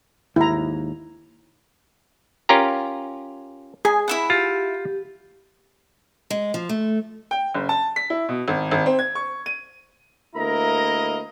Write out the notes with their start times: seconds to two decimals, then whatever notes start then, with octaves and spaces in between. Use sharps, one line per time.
0.36 D#2 G#2 E4 A#5
2.49 C#4 F4 G4 A#4 A#5
3.85 G#4 G#5
4.08 E4 E5 F#5 B5
4.30 F4 G4
6.30 G#3
6.54 F3
6.69 A3
7.31 G5
7.54 F#1
7.69 A5
7.96 B6
8.10 E4
8.29 B2
8.48 G#1
8.71 G#1
8.86 C4
8.99 G#6
9.15 C#6
9.46 D#7
10.36 D2 A#3 E4 A#4 D#5 A#5